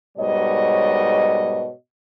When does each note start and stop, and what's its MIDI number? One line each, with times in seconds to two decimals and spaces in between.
0.18 1.69 44
0.18 1.69 47
0.18 1.69 55
0.18 1.69 70
0.18 1.69 73
0.18 1.69 75